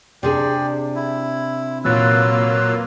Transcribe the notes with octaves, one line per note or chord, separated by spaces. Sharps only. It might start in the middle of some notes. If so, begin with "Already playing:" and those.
C3 D4 G#4 D5 G5
E4
E2 A#2 F#3 A#3 F4 B4 E6 A6